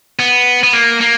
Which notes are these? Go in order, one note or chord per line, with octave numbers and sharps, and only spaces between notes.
B3
B3
A#3
A#3